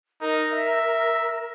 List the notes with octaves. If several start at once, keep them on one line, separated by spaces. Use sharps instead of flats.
D#4 A#4
E5